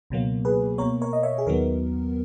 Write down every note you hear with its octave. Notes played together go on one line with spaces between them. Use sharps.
C#2 B2 F#3 A#3
G#4 B4
B2 A#3 A#4 C#5
A#4 C#5
D#5
C#5 E5
G#4
D#2 D#3 F#3 B3 A#4